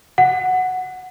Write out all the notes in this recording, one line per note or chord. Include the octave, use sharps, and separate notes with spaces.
F#5